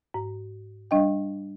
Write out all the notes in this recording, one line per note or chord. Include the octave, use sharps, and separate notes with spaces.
G#2
G3 D4 D#5 G5